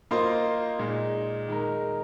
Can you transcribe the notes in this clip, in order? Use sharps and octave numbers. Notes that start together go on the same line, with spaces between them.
A#3 F4 C5 D#5
A#2 G#3 D#4
D#3 G#3 D#4 A#4